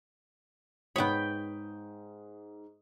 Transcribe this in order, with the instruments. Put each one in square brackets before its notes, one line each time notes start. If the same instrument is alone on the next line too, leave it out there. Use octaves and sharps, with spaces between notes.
[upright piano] G#2 D#6 [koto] B3 C#5 [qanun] G5 B5